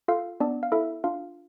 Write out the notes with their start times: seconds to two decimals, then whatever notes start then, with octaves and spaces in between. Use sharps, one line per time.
0.08 F4 A4 F5
0.40 B3 D4 D5
0.63 F5
0.72 E4 A4 E5
1.04 D4 F4 F5